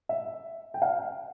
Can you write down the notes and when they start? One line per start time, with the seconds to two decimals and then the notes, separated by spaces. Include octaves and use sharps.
0.09 E5
0.74 G5
0.82 F5